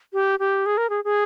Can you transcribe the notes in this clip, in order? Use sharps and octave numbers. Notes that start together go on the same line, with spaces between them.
G4
G4
G#4
A#4
G#4
G#4